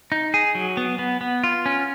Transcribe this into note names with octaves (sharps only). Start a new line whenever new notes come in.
D#4
G#4
F#3
B3
B3
B3
F4
C#4